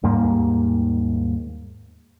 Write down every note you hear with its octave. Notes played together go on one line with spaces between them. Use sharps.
D#2 G#2 G3 A#3